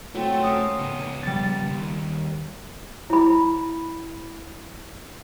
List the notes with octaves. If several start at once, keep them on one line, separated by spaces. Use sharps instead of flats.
F#3 A3 C4
C#4 A#4 F5 D#6
C#2 B3
G3 A6
D#2
E4 B5